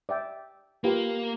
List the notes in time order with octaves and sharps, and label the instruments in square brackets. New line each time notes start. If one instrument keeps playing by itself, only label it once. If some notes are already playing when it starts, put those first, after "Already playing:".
[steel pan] D5 E5 G5
[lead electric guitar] A#3 [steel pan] F4 G4 B4